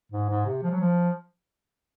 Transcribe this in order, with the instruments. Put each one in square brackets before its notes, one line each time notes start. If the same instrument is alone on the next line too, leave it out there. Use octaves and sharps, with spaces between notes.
[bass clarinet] G#2
G#2
C3
F3
F#3
F3